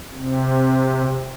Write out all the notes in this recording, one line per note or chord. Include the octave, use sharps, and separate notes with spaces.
C3